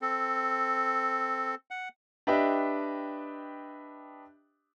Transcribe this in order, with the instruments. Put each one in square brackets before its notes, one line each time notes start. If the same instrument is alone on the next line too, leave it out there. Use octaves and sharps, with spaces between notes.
[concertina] C4 A4
F#5
[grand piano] D4 G4 B4 D#5 E5 G5